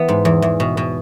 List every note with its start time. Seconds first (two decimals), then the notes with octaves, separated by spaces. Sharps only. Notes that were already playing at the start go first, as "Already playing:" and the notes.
Already playing: E3 B3
0.08 G#2
0.25 E2
0.42 E2
0.60 B2
0.77 B2